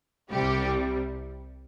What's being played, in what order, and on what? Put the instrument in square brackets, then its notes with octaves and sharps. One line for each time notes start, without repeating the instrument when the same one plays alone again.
[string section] C2 C3 G3 G4